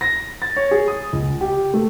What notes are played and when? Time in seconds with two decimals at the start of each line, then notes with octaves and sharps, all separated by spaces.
0.01 A#6
0.42 A6
0.57 C#5
0.71 G#4
0.88 D#6
1.13 C#2
1.41 G4
1.74 A3